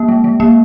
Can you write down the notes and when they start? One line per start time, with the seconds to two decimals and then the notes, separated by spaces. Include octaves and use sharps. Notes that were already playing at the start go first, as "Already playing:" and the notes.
Already playing: A#3
0.09 G#3
0.24 G#3
0.40 A#3